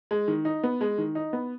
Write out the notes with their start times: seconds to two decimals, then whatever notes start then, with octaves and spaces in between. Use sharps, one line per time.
0.11 G#3
0.28 D#3
0.45 D#4
0.63 B3
0.81 G#3
0.98 D#3
1.15 D#4
1.33 B3